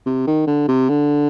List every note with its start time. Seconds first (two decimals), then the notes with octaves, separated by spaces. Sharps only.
0.06 C3
0.27 D#3
0.47 D3
0.68 C3
0.89 D3